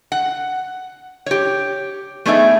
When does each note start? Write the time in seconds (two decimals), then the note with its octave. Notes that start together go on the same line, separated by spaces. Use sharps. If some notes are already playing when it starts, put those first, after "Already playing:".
0.12 F#5
1.26 G4 C#5
2.26 A3 B3 D#4 G#4 D5 E5